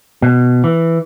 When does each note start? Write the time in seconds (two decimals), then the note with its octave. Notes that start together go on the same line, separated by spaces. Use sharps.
0.22 B2
0.64 E3